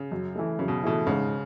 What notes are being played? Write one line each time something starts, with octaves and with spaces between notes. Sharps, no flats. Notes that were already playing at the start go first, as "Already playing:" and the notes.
Already playing: C#3
F#2
E3 A3
F#2 C#3
B2
B2 E3 A3
G#2 C#3